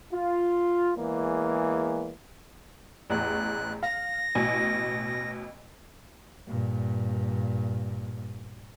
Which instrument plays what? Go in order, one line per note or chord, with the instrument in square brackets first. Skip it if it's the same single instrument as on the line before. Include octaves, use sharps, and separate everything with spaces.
[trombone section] F4
E2 E3 G#3 A#3
[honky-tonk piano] A1 E2 [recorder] F#6
[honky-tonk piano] F5 [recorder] A#6
[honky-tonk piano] A1 B2 G#5
[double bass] G2 A#2